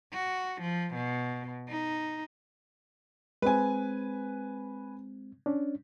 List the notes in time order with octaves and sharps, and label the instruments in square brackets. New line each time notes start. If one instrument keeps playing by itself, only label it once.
[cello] F#4
F3
B2
D#4
[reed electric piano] G#3 C4 [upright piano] B4 G#5
[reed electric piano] C#4 D4